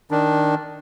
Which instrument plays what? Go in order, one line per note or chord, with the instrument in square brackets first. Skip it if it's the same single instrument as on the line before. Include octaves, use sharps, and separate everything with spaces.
[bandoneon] D#3 D4